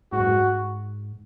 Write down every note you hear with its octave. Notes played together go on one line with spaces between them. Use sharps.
G#2 F#4
G2
G#2